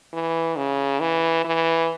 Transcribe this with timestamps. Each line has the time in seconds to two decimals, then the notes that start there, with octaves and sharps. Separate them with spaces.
0.13 E3
0.57 C#3
1.00 E3
1.45 E3